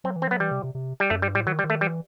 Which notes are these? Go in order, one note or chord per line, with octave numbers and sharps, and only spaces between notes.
F#3 C4
E3
C4
F#3 B3
E3 G3
C3
C3
C3
G3
F#2 A3
G2 G3
A2 G3
D#3 F#3
G3
D#3
A3
E3 G3